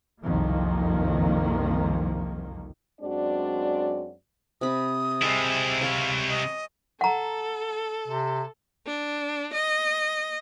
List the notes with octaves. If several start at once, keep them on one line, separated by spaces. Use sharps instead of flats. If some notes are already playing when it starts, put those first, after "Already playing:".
F#1 C2 F2 D#3 F3 A#3
F#2 G#3 C4 D4 F#4 D5
C3 B5 D#6
C3 G#3 E4
C#5 F5 C6 C#6
D#5
A4 F#5 A#5
C3
D4
D#5